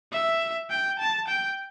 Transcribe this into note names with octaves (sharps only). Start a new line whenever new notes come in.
E5
G5
A5
G5